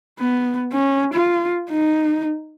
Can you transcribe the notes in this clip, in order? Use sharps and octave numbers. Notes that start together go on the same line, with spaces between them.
B3
C#4
F4
D#4